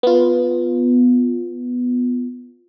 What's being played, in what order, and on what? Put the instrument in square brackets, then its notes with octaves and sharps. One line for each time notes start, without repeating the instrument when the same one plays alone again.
[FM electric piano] B3 F4